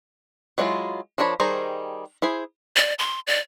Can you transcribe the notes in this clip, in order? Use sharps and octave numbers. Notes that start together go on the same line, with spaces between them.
F#3 G#3 D4 E4 F4
F3 D4 A#4 C#5 B5
D#3 G3 G#4 C5 A#5
E4 G#4 C5
D5
C6
D5